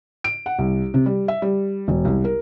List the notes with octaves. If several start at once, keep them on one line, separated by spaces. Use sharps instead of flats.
D7
F#5
C2
C3
G3
E5
G3
E1
C2
A#4